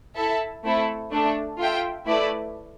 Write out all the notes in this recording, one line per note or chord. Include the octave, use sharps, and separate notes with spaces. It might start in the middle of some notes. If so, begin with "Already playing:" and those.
E4 A4 E5 A5
A3 C4 E4 A4
A3 D4 A4
F4 A4 E5 G5
A3 E4 B4 D5